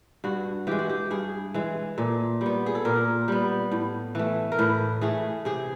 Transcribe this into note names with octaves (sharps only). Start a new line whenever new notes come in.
G2 F#4
E3 G#3 G4
F#4
G4
G2 G#4
E3 G#3
A#2 A4
G3 B3
G#4
A4
A#2 A#4
G3 B3
A2
E3 A3
A#4
A2 B4
E3 A3 G#4
C3 G#4